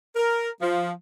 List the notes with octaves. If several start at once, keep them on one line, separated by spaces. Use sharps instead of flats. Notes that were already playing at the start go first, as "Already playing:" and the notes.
A#4
F3